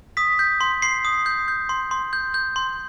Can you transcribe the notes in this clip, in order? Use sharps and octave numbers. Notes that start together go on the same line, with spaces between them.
D#6 B6
G6
C6
C6 C7
D#6
G6
G6
C6
C6
G6
G6
C6